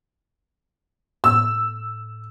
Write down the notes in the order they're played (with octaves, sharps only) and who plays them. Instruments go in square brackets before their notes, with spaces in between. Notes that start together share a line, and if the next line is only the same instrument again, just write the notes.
[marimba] A2 [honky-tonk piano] E6